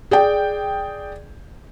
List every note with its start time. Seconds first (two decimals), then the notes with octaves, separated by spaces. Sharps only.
0.11 G#4 D5 G5